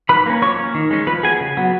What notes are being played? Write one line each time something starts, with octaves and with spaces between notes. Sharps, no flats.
D#3 B4 B5
A#3 C#4
F3 C#5 C#6
A#3 C#4
D#3
G#3 C#4
F3 B4 B5
B3 G#4 G#5
C#3
F#3 B3